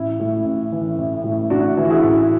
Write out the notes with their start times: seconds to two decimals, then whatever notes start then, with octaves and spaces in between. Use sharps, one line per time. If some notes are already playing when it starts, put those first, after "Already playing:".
Already playing: A1 E4
0.20 A2
0.45 A1
0.72 E3
0.98 A1
1.24 A2
1.50 A1 D4 F#4
1.77 E3
1.85 F#4
1.90 E4 G#4
2.04 A1